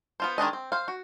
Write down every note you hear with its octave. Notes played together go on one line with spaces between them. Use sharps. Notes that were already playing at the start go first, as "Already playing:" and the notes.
B3 F4 C5
D#3 G#3 D4 D#5
C4
C5 F5
F#4